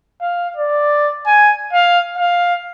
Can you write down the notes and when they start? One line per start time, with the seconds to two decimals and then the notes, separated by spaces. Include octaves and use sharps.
0.21 F5
0.56 D5
1.27 G#5
1.73 F5
2.18 F5